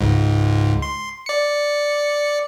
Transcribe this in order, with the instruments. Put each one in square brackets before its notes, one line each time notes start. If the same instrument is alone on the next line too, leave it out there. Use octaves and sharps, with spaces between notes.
[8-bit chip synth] C#2 G#2
C6
D5 C#7